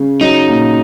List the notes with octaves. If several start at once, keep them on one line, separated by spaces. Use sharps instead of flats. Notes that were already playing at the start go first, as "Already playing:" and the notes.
Already playing: C#3
F#3 D#4
A#2